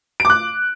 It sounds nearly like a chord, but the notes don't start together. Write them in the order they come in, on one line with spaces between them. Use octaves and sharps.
D7 D6 F#6